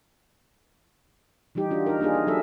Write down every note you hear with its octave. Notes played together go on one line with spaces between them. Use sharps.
E3 G3 D#4 G4
D4 F4 F#4
D#4 A#4
A#3 D4 D#4 F4 G#4
E4
F#3 D4 A4 E5